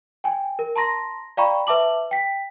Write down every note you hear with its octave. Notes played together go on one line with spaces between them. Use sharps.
G5 G#5
A#4
A5 A#5 C6 A#6
D5 F5 G5 A#5 B5 C#6
B4 E5 A5 D6 F#7
G5 B6